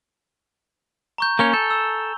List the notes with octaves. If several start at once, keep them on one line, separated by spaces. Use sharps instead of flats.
A#5 C#6 G6
A#3 C#4 C#5 G#5 F7 G7
A4 G6
E6